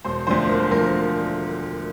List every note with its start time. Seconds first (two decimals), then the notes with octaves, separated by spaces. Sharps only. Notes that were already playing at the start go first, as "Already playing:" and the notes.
0.05 E1 C5
0.27 D2 D3 F3 C5
0.48 E1 A#4
0.60 C5
0.71 D2 D3 F3 A#4